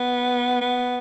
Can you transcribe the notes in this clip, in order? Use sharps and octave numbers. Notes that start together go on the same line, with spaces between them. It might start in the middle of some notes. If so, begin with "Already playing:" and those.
Already playing: B3
B3